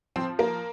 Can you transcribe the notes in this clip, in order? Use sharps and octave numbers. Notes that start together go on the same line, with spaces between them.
F3 C4 C5
A#3 A#4